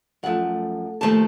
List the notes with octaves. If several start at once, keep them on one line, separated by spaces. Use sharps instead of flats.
F#2 F3 A3 F#5
D#2 C#3 F3 A3 A5